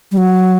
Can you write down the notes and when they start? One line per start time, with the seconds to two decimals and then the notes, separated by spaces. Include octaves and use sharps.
0.12 G3
0.18 F#3